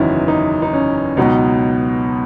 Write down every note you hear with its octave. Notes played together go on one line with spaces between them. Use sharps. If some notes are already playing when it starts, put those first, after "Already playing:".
Already playing: F#1 E2 D#3 C#4 D#4 E4 F#4 B4
D#4
D#4
C#4
C#2 B2 F#3 B3 D#4